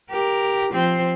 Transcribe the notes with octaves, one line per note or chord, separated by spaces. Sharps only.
G4 A#4
F3 C4 C5